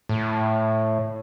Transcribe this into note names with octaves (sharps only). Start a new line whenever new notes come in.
A2